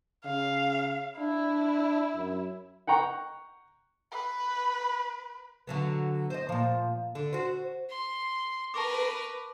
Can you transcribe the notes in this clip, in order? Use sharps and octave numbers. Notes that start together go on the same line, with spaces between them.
C#3 F5
D4 E4
F#2
F#5 G5 A#5 C#6
B4
D3 F#3 B3
C5 D#5
A#2 F3
D3
F#4 C5
C6
A#4 B4 A5 C#6 D6